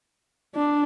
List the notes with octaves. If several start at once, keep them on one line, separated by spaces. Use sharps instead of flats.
D4